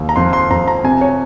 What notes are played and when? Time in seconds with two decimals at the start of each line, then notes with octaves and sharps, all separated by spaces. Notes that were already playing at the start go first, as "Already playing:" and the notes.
Already playing: D#2
0.09 A#5
0.16 F2 C6
0.33 C6
0.50 F2 A#5
0.68 A#5
0.84 C3 G#5
1.01 C#5